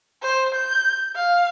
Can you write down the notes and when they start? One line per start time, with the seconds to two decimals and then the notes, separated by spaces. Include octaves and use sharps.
0.22 C5
0.55 G6
1.15 F5